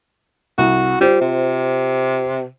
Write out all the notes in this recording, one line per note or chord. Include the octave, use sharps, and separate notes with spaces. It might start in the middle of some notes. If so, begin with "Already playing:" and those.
C2 F#4
G3 F4 C5
C3